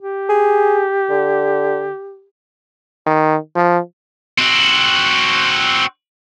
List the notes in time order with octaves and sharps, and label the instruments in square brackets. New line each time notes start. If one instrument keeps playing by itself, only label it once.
[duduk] G4
[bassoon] G#4
D3
[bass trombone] D#3
F3
[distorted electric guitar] C4 F#4